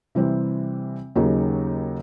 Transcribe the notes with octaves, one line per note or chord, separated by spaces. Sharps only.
C3 E3 G3 C4
D#2 C#3 F#3 A#3 D#4